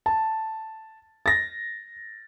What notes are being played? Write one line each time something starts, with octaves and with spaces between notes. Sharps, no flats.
A5
A6 A#6